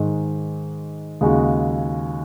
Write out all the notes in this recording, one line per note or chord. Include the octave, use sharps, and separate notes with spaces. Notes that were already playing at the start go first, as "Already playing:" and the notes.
Already playing: G#2 D#3 G#3
D#2 C#3 G#3 D#4 F#4